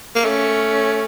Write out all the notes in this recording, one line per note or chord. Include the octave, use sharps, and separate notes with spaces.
A#3
A3 C#4